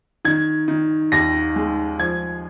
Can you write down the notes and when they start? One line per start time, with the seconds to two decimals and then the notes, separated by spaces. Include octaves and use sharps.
0.25 D#3 G#6
0.68 D#3
1.12 D#2 A#6
1.56 G#3
1.99 F3 G#6